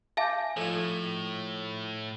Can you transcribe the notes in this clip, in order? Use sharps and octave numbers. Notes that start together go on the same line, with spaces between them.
E5 F5 G#5 A5 D6 G6
A2 F3 D#4 A4